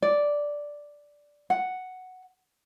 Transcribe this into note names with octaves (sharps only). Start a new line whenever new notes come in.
D5
F#5